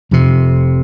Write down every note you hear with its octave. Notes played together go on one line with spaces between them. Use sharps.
F1 F2 C3